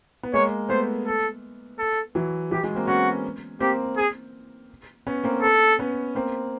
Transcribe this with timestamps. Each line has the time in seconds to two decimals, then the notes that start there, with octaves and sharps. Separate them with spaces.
0.23 B3
0.33 G#3 A#3 C#5
0.69 A3 B3 C5
1.06 A4
1.79 A4
2.15 E3 F#3
2.51 E3 F#3 G4
2.63 F#3 G#3
2.75 A#3 C4
2.87 B3 C#4 F#4
3.60 A#3 C4 G4
3.97 G#4
5.07 B3 C#4
5.24 A#3 C4
5.42 A4
5.79 B3 C#4
6.15 A#3 C4